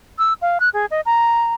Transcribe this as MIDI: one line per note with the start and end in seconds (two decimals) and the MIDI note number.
0.19 0.33 88
0.42 0.58 77
0.60 0.69 90
0.73 0.86 68
0.91 1.01 75
1.06 1.54 82